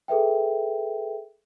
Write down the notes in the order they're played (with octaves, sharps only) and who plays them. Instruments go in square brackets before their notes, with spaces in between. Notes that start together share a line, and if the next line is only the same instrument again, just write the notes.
[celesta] G#4 A4 B4 E5 G5